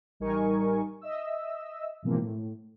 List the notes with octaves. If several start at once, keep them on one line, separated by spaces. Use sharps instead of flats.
A1 G3 D#4 A#4 G#5 C#6
D#5 E5 E6
G#2 B2 E3 F3 A#3 C4
A2